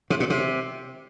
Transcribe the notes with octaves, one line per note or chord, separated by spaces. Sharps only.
C3
A#2
C3